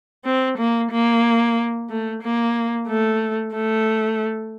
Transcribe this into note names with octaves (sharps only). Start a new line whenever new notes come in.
C4
A#3
A#3
A3
A#3
A3
A3